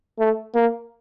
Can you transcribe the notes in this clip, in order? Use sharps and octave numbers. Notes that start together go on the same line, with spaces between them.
A3
A#3